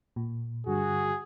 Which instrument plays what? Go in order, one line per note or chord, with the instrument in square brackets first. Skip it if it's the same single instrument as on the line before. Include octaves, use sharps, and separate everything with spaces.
[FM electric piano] A#2
[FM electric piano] G2 D3 G3 [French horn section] F#4 [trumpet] G#4